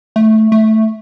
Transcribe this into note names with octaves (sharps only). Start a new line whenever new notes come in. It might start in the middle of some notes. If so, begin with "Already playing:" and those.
A3
A3